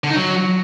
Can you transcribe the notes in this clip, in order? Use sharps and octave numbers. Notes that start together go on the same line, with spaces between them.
D3
D#4
F#3